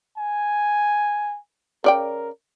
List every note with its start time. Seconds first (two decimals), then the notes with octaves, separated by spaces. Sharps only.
0.18 G#5
1.84 C#3 A#4 D5 G5